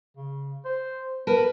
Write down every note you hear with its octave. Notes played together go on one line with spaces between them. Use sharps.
C#3
C5
B3 A#4 B4 A5